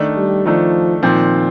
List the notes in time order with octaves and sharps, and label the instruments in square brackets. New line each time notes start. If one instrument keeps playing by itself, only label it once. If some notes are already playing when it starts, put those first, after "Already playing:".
Already playing: [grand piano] D#3 A3 D4
[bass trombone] G3
[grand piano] D#3 A3 D4 [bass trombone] F3
[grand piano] A#2 F3 C4 [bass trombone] D#3